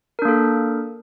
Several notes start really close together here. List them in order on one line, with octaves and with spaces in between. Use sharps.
A#4 D4 A#3 A4